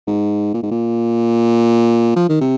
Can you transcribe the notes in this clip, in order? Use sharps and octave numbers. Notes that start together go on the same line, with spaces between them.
G#2
A#2
G#2
A#2
F3
D#3
C3